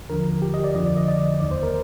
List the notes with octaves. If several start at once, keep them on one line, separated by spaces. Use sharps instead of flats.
D#2 D3 F3 A#4
G4
D#5
D5
F2 D3 F3 D#5
D5
D#5
D5
D#2 D#3 D5
C5
A#4